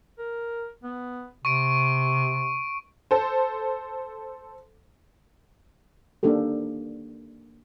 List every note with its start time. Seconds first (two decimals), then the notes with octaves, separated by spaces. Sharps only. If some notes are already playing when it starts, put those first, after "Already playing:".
0.18 A#4
0.83 B3
1.45 C3 C#6 D7
3.11 A4 C5
6.23 A#3 D4 D#4 G4 A4